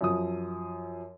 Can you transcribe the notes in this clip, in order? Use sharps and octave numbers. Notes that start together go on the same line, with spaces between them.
F#2 F3 D#6